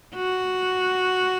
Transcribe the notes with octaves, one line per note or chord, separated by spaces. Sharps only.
F#4